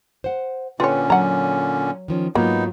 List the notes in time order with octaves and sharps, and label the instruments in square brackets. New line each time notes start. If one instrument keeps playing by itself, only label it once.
[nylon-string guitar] C5 F#5
[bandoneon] A#2 D3 C#4 [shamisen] F4 C#5 [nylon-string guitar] A4 B4 G5
[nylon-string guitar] F#3 [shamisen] F#5 A#5
[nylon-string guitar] D#3 F3 C#4
[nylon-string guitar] G#2 F#3 F4 [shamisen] A#3 [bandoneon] B3 D#4